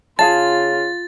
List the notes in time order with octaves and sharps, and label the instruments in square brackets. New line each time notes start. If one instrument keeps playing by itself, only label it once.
[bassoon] C#3 [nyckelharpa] F4 [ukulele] G#4 F5 A5 [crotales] A6